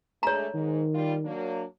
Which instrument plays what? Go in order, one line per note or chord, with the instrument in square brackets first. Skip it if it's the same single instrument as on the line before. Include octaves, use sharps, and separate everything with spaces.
[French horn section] G#3 A3 D4 [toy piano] C#5 A#5
[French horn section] G#2 [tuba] D#3
[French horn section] G3 F4
F#3 A#3 D4